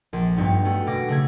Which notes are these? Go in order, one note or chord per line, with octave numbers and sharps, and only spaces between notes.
A#1
G2 G3 B3 D#4
A3 C#4 F#4
B2 D6 A#6
C#3 A3 G#6